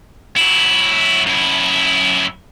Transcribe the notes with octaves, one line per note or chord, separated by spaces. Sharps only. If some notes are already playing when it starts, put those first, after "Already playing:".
F#3 E4
F#2 E4